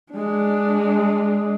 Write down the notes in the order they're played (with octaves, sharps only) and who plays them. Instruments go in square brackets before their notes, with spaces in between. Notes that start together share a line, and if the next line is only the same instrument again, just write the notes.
[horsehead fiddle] G#3 D4